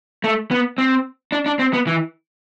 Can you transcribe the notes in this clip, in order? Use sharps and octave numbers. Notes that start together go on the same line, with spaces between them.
A3
B3
C4
D4
D4
C4
B3
E3